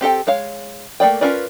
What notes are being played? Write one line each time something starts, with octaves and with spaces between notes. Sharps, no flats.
C4 G4 A4 G5
G#3 C#5 F5
A3 A#3 D5 G5
C#4 F4 A#4 B4 D5